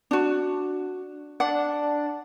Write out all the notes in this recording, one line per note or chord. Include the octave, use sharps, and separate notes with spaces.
D4 F#4
D4 F#5